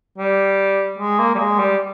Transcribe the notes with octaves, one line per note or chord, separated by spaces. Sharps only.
G3
G#3
A#3
G3
G#3
G3